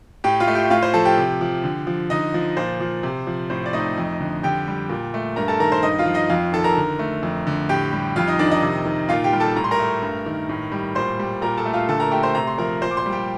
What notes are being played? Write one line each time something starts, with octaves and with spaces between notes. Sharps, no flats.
A2 G4 G5
F4 F5
A3
G4 G5
A2 F4 F5
C5 C6
F3 A4 A5
G4 G5
C3
F3
D3
F3
D3 D#4 D#5
F3
A#2 C5
F3
C3
F3
A2 C5
D5
A3 D#4 D#5
F2
D3
D3 G4 G5
G3
A#2
A3
G2 A#4 A#5
A4 A5
D#3 A#4 A#5
C5 C6
G2 D#4 D#5
F4 F5
F3
D#4 D#5
F2 F4 F5
D#3 A4 A5
A#4 A#5
D3
A3
F2
D3
A2 G4 G5
G3
F2 F4 F5
D#4 D#5
D#3 D4 D5
D#4 D#5
C3
D#3
A#2 F4 F5
G4 G5
G3
A4 A5
A2 A#5
C6
A#4 A#5
A3
G2
D#3
A2
G3
A#2 C5 C6
G3
A#2 A#4 A#5
A4 A5
A3
F4 F5
D3 A4 A5
A#4 A#5
A3 G4 G5
C5 C6
C3 A#5
C6
F3 A#4 A#5
A#2 C5 C6
D6
C5 C6
G3
G4 G5